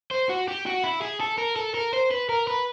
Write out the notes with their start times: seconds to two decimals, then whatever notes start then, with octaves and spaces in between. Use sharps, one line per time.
0.11 C5
0.29 F#4
0.48 G4
0.66 F#4
0.84 E4
1.02 G#4
1.21 A4
1.38 A#4
1.56 A4
1.74 A#4
1.93 C5
2.11 B4
2.29 A#4
2.47 B4